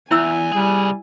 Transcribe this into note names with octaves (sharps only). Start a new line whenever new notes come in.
E2 E4 E5 G#5 E6
C2 G3 G#4